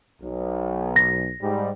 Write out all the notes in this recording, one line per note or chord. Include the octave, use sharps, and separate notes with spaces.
B1
A#6
G#2 G3